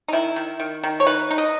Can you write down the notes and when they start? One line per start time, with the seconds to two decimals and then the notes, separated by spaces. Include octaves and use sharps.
0.08 D#4
0.13 D#3 E4
0.36 D#3
0.60 D#3
0.84 D#3
1.00 C#5
1.07 D#4 B4
1.31 D#4
1.38 D#5